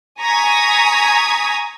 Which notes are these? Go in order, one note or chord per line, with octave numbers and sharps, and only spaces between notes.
G#5 A#5 C#6 D#6 G#6 B6